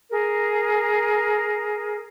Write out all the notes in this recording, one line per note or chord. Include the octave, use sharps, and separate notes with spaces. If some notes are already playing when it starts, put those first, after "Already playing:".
G#4 A#4